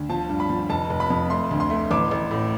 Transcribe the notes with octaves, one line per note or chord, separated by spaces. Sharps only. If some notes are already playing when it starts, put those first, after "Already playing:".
Already playing: D2
F3 A5
G2
B5
F3
F1 A5
F1
B5
F2
A3 C6
D2
C6
A3
A1 D6
A1
A2